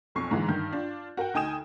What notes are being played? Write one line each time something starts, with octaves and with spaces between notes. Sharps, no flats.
B1 F2 C#6 C7
G#2 D3 E3 G#3
G2 D#3 G6
D4 F4
F#4 A#4 F#5 G5
D2 D#4 G5 G#5 D#6 E7